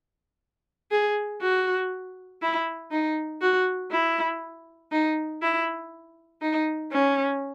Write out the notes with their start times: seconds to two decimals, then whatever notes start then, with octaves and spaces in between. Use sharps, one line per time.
0.91 G#4
1.41 F#4
2.42 E4
2.92 D#4
3.42 F#4
3.92 E4
4.92 D#4
5.43 E4
6.42 D#4
6.92 C#4